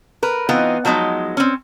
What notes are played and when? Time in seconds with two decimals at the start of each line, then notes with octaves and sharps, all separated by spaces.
0.23 A#4 B4
0.49 E3 B3 C4 D#4 F4
0.85 F3 F#3 G#3 B3 D#4
1.37 C4 C#4